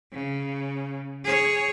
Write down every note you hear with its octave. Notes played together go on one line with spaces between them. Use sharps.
C#3
G#4 C#5